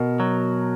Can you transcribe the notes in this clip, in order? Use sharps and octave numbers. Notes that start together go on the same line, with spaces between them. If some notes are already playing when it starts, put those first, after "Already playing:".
Already playing: B2 A#4
F#3